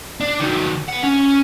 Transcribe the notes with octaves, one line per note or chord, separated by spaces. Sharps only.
D4
D#3 F#3
B4 F#5
C#4